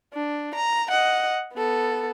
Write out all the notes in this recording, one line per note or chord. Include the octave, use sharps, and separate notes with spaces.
D4
A#5
D#5 F#5
B3 A4